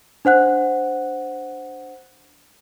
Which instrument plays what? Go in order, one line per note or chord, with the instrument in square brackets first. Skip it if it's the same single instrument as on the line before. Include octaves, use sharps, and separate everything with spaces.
[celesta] D4 C5 F#5 F#6